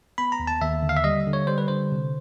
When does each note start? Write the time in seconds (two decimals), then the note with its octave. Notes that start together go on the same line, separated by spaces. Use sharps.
0.18 B3 B5
0.32 A#5
0.39 D#2
0.47 A5
0.61 D#2 E5
0.83 D3
0.89 F5
0.97 E5
1.04 G3 D#5
1.27 D3
1.33 C#5
1.47 G3 C5
1.58 B4
1.68 D3 C5
1.92 C3